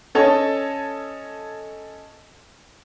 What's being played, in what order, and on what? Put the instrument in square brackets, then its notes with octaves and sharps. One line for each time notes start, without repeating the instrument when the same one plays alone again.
[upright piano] C#4 A4 C#5 D#5 A5